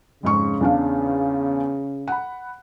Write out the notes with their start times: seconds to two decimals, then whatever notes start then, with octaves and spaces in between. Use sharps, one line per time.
0.23 F2 G#2 C#3 C#6
0.61 E2 D4 F5
2.08 F#5 B5